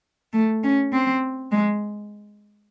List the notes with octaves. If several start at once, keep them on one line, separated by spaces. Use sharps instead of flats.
A3
C#4
C4
G#3